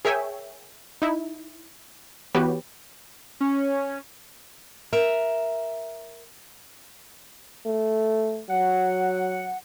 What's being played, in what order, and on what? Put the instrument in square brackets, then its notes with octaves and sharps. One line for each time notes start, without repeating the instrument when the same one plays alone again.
[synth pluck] G#4 A#4 C#5 E5 G5 G#5
D#4 E4
E3 B3 F#4 G4 B4 C#5
[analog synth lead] C#4
[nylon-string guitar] A#4 E5
[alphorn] A3
[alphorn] F#3 [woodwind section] F#5